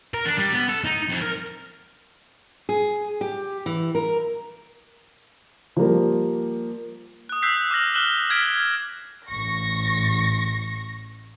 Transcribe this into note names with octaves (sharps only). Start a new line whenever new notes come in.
A#4
D4
G3
B3
A4
D#4
F2
A#4
G#4
G4
E3
A#4
F3 G3 A#3
D#6 F#6
E6 F#6 G6 B6 C7
D6 F6 A#6 F#7
E6 F#6 E7 F#7 G7
F6 F#6 G#6 B6 D7 E7
A1 C#6 A#6